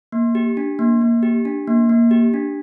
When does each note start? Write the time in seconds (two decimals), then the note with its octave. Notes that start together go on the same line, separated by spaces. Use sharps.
0.12 A#3
0.35 G4
0.57 D4
0.79 A#3
1.01 A#3
1.23 G4
1.45 D4
1.68 A#3
1.89 A#3
2.11 G4
2.34 D4